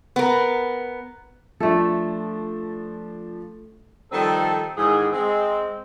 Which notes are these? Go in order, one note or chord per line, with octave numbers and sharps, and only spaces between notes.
B3 A#4
F3 A3 D4 A4
D#3 F3 G3 C4 A4
G#2 D#3 E3 G#4
G#3 C4